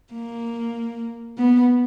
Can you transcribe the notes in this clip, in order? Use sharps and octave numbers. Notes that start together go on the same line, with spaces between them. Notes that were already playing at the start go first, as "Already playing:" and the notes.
A#3
B3